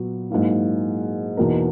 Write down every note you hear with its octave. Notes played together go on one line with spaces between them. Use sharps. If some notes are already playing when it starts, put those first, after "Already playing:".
Already playing: A#2 F#3 B3 F#4
G#2 F#3 A#3 E4
E2 B2 A#3 D#4 A#4